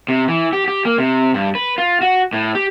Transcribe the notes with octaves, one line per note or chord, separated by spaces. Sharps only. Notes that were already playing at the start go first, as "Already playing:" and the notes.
C3
E3
G4
G4
A#3
C3
G2
B4
F4
F#4
A2
G4